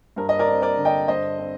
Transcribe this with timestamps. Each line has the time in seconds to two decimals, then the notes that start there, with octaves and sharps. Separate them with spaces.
0.16 G2 A#4
0.29 D#5
0.39 A#4 D5
0.48 C4
0.62 A#4 D5
0.78 D3
0.85 D#5 G5
1.08 G2 C5 D#5
1.39 C4